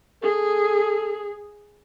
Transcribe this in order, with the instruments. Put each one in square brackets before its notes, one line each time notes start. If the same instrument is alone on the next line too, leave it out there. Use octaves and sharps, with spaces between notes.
[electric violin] G#4 [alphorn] A4